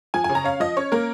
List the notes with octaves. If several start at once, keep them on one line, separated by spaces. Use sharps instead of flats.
F3 G#5
G#5
C#3
A#5
C#4 F5
F3 D#5
C#4 C#5
A#3 A#4